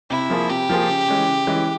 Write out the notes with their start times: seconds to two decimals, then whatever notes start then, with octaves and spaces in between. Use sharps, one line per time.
0.10 C3 E4
0.30 F3 A#3 F4 G#4
0.49 C3 G4
0.69 F3 A#3 F4 G#4
0.88 C#3
1.09 E3 G#3 C#4
1.28 C#3
1.47 E3 G#3 C#4